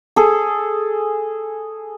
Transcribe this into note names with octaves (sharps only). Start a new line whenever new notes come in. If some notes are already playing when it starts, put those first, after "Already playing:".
G#4 A4